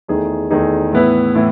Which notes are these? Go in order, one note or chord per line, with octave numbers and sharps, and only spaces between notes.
E2 D#3 A3 D#4 G#4
E2 D#3 A3 D#4 G#4
A2 E3 B3 E4 B4
A2 E3 B3 E4